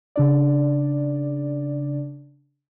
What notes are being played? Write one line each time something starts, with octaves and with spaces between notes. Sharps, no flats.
C#3 D4 D5